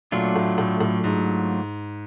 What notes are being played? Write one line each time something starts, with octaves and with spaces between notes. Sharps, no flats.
A#2 F#3 A3 D4 F4
A2
A2
A2
G#2